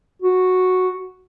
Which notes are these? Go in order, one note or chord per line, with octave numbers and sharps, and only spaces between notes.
F#4